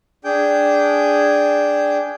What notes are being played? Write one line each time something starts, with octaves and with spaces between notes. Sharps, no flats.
D4 G#4 G5